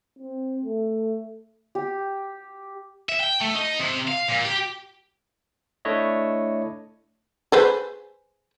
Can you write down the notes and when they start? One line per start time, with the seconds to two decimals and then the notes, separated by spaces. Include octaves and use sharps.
0.19 C4
0.65 A3
1.75 G4
3.09 E5
3.20 G5
3.40 A3
3.54 D#4
3.79 C3
4.08 F5
4.28 A#2
4.45 G4
5.85 A3 D4 E4 C#5 D#5 E5
7.52 G#4 B4 C5